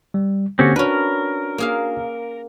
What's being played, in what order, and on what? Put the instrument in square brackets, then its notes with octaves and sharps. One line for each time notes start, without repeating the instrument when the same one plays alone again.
[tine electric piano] G3
[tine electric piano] D3 A#3 G4 [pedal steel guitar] C4 C#4 F#4
[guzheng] C#4 B4 [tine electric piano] D4 F#4 [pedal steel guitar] A#4
[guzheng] A#3 G#4 F5